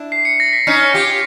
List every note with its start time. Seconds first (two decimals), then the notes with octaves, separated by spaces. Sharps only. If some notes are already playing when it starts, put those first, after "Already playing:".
Already playing: D4 E4
0.12 C7
0.25 C#7
0.40 A#6
0.53 B6
0.67 C#4 D#4
0.94 F4 G4